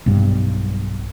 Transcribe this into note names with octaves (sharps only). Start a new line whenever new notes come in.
B1 G2